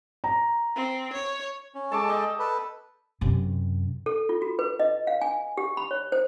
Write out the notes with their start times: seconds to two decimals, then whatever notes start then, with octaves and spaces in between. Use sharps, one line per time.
0.24 A#5
0.76 C4
1.13 C#5
1.75 C#4
1.92 G#3 A4 A5 C#6 D6
2.08 D5 D#5 G5
2.39 A4 B4
3.21 F#2 C3
4.06 A4
4.29 F4
4.42 F#4
4.59 B4
4.80 D#5
5.07 F5
5.21 G#5
5.57 G4
5.77 B5
5.91 C#5
6.12 C5